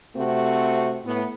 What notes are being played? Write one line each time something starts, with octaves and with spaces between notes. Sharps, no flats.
C3 A3 C4 F#4
A2 B3